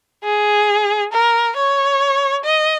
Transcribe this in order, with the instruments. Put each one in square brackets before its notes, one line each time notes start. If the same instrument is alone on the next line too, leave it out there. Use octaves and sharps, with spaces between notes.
[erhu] G#4
A#4
C#5
D#5